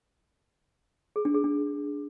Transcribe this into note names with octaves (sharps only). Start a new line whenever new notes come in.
G#4
D4
G#4
D4